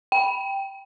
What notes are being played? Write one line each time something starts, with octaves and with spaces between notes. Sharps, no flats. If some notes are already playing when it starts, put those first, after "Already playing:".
G5